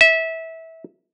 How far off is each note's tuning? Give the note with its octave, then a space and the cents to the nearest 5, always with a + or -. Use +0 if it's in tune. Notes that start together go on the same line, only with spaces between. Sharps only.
E5 -20